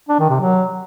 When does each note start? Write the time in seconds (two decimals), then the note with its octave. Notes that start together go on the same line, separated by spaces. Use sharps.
0.09 D4
0.19 D#3
0.30 C3
0.40 F#3